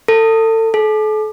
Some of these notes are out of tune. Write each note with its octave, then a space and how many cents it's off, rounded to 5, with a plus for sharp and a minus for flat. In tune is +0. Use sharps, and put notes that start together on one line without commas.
A4 +30
A4 -40